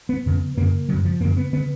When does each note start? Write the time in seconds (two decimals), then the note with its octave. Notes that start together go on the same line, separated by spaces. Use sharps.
0.09 B3
0.26 F2 C#3
0.57 F#2 C#3 A#3
0.89 F#2 C#3 F#3
1.05 F3
1.20 F#2 C#3 A#3
1.37 B3
1.53 C#3 B3